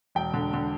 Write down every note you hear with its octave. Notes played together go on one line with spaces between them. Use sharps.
E1 G5
D3
D3